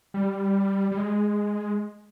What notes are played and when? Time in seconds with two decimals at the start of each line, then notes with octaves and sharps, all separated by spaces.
0.14 G3
0.91 G3
0.98 G#3